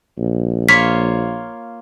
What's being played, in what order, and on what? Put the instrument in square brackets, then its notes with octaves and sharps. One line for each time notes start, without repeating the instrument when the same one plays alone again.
[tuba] A#1
[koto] A#3 F4 C#5 [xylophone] B6